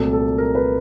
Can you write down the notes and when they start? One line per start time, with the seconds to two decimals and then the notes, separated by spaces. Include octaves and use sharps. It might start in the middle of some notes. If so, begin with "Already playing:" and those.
Already playing: C2 A#2 F#3 A3 C4 A4
0.13 A4
0.38 A#4
0.55 B4